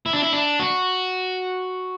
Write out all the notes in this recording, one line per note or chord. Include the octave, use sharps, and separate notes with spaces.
E4
D4
E4
D4
F#4